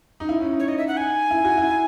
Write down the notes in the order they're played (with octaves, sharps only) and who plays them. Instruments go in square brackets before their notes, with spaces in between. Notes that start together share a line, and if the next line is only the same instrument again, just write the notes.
[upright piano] D#4
E4
C#4
D#4
[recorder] C#5
D#5
E5
F#5
G#5
[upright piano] E4
F#4
E4